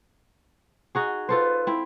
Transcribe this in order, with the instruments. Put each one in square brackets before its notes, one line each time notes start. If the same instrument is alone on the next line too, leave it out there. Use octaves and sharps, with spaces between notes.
[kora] D#4 F#4 G#4
[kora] F4 A4 C5 [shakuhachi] B4
[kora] C4 E4